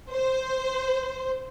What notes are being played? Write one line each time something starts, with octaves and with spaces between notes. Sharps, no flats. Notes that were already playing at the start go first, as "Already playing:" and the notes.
C5